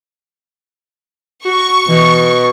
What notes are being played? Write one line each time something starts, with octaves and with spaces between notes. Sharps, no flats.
F#4 C#6
B2 E3